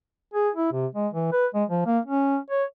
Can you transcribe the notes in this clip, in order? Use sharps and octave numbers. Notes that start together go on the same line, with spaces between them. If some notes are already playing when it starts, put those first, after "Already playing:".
G#4
E4
C3
G#3
E3
B4
G#3
F3
A#3
C#4
C#5